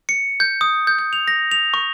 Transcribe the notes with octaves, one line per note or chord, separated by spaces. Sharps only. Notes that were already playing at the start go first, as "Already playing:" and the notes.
C#7
G6
D#6
G6
G6
F7
A#6
F7
C#6